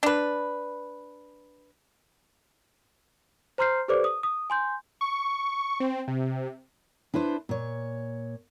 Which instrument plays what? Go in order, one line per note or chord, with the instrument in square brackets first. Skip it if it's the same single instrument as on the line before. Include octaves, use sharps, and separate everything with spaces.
[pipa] D4 B4
[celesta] C5 A#5 C6 F6 G6 C7
G4 A4 B4 C5 D5 D6
D#6
D#6
G#5 C6 G6
[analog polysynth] C#6
C4
C3
[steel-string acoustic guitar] D4 E4 B4 C5
A#2 C#5